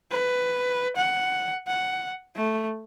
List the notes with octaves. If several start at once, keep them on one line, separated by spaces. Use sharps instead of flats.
B4
F#5
F#5
A3